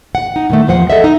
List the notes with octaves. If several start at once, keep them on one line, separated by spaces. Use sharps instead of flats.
F#5
D#4
A2 D#3 A3
E2 F3 C5 F#5
A4 D#5 E5
D#4